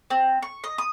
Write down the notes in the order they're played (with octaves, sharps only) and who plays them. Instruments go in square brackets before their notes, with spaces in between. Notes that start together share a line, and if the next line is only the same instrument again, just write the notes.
[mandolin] C4
C#6
D#5
D#6